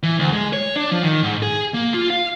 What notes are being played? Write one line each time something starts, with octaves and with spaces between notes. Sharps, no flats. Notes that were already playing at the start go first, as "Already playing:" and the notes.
E3
D2
G#3
C#5
D4
F3
D#3
G#2
G#4
A#3
F4
F5